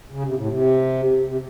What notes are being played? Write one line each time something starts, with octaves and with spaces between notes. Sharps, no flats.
C#3
C3
A2
C3
C3